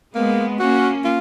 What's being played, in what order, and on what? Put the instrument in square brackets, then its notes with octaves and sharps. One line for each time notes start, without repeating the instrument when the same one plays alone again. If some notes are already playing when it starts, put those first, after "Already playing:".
[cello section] G#3 B3 [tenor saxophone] A#3
[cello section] A#3 C#4 [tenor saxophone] F#4
[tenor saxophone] F4